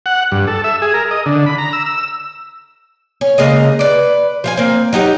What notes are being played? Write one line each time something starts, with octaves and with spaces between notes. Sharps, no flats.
F#5
G2
A4
E5
G#4
A#4
D#5
D3
B5
A#5
E6
E6
C#4
C#3 G#3 A#3 D#5
B4 D5
F3 F5 G#5
A#3 C4
F#3 D#4 G4 D#5